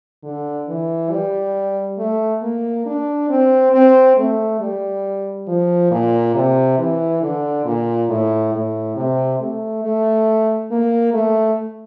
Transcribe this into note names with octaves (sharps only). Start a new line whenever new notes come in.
D3
E3
G3
A3
A#3
D4
C4
C4
A3
G3
F3
A#2
C3
E3
D3
A#2
A2
A2
C3
A3
A3
A#3
A3